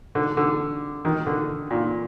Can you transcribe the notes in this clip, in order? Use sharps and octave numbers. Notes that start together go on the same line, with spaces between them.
D3
D3
D#3
D3
A#2